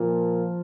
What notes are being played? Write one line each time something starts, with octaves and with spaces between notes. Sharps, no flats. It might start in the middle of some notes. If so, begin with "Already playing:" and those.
Already playing: A#2 F3